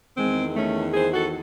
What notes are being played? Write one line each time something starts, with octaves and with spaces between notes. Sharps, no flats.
E2 D#3 G#3 C4
A3 C#4
G#4 C5
F#4 A4